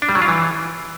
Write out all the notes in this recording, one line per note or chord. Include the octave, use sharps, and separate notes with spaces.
D4
G3
F#3
F4
E3